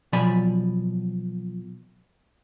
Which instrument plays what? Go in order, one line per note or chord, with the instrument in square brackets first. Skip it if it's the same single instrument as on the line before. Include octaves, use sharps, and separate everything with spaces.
[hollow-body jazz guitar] B2 F3 F#3 D5 G#5 B5